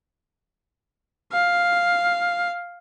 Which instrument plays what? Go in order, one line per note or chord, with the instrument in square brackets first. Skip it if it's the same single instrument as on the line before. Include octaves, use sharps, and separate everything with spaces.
[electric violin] F5